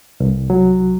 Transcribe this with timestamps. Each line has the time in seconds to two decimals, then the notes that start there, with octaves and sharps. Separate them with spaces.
0.20 C2
0.50 F#3